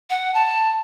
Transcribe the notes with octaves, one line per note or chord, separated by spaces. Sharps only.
F#5
A5